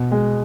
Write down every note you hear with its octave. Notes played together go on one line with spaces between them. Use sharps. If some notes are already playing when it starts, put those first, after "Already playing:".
Already playing: B2
G#3